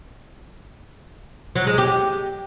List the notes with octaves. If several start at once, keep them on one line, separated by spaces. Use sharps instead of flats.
F#3
G#3
G4